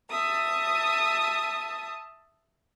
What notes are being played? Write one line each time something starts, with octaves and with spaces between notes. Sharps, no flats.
E5 A5 D#6